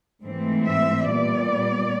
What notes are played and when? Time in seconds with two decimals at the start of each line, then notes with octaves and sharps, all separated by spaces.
0.24 G#2 E3 A3 C4
0.66 E5
1.09 A#2 G3 B3 D5